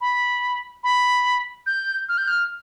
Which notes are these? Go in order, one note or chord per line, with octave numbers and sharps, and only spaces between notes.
B5
B5
G6
F6
G6
F6